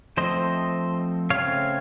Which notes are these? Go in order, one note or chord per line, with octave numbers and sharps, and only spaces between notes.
F3 A3 C4 C5 D#5
C#3 A3 C4 C#5 F5